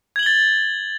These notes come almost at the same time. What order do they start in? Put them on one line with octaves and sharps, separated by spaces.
G#6 F#7 G7 A6